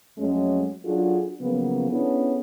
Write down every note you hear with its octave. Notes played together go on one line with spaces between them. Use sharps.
F2 F#3 G#3 A3 C#4
F#3 D4 F4 F#4 G#4 A4
C#3 F3 F#3 A#3 B3
B3 C#4 D4 E4 G#4 A4